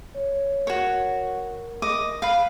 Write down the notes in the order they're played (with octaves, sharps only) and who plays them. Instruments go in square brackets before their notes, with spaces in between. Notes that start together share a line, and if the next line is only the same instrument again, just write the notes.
[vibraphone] C#5
[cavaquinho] F#4 C#5 [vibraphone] A#4
[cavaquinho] D#5 D6
B4 F5